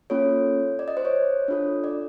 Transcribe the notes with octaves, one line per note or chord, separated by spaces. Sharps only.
A#3 C#4 F4 A4 C#5
D5
D#5
C5
C#5
D4 F4 A4
D5